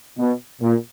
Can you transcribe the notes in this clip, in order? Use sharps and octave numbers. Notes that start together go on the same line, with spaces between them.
B2
A#2